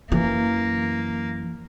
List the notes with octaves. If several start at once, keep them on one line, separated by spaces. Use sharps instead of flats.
F#2 E3 A#3